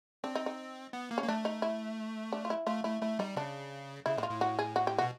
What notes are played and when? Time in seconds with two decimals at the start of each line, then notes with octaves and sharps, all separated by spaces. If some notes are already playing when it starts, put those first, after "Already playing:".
0.24 C4 D4
0.35 D#4
0.46 D#4
0.93 B3
1.11 A#3
1.18 C#4
1.23 A#3
1.28 A3 D4
1.45 D#4
1.62 E4
2.33 D4
2.45 F4
2.50 E4
2.67 A3 F4
2.84 A3 E4
3.02 A3 E4
3.19 G3 D#4
3.36 C#3 D4
4.06 C#3 E4
4.17 A2 E4
4.23 F4
4.29 A2
4.41 F#4
4.59 G#4
4.76 F#4
4.87 G4
4.98 F#4
5.01 B2